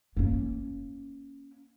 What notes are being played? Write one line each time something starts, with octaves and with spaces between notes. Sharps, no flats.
A#3 C#4